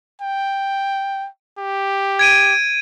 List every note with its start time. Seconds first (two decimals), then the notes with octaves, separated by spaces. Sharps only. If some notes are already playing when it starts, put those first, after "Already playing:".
0.21 G5
1.59 G4
2.19 G#6 D7 D#7